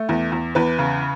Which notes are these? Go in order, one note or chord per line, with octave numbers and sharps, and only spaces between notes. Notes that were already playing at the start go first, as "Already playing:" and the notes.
Already playing: A3
E2
E2
E2 B4
C#3